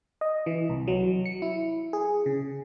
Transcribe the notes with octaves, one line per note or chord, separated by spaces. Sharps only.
D#5
E3
C2
F#3
C#7
E4
G#4
C#3